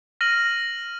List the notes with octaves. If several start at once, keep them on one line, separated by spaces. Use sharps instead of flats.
F6 A#6 D#7 F#7